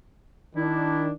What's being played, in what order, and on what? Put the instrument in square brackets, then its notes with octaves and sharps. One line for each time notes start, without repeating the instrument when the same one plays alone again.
[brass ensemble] D#3 D4 [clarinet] E4